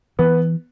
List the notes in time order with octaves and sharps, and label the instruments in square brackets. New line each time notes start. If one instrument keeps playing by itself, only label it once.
[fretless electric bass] E3 [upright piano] B3 B4